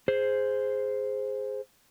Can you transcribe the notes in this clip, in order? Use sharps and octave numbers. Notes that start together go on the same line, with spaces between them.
G#4 C5